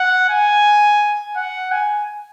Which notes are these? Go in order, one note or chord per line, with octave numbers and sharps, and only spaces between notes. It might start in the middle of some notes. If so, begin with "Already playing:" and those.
Already playing: F#5
G#5
F#5
G#5